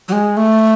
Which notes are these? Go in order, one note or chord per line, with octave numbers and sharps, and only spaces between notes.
F#3
G#3
A3